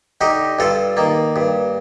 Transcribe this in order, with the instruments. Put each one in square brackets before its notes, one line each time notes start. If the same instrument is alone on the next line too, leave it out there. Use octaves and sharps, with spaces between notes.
[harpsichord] D3 D#4 G4
G2 F4 A4
D#3 A#3
G2